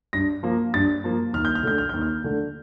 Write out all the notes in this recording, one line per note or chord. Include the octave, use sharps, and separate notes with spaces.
G2 A#6
F3 A#3
G2 A6
F3 A#3
D#2 F6
G6
F6
D3 A3 G6
F6
D#2 G6
F6
D3 A3